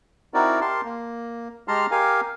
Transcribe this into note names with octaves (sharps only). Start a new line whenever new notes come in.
C4 D#4 E4 F#4 A#4 D5
G4 A#4 A5 C6
A#3
G#3 G4 A5 A#5 C6 F6
G4 A#4 F5 G#5